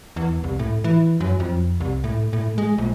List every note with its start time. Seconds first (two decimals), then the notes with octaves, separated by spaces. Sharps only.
0.16 E2
0.44 C2
0.59 A2
0.84 E3
1.20 F#2
1.40 F2
1.80 C2
2.04 A2
2.33 A2
2.58 G#3
2.78 A#1